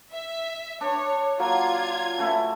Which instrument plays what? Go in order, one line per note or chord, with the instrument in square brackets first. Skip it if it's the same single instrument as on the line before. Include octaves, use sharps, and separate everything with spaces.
[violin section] E5
[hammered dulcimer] D4 [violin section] C#5
[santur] F#3 A#3 [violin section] F4 G#6
[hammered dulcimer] C#3 A3 E4